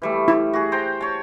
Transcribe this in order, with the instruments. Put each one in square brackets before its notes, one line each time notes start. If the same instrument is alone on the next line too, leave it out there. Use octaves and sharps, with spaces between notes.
[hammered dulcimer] E3 G3 A3
[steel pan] E4
[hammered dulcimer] F#4 G#4
C5 G5 A#5
C#5 A5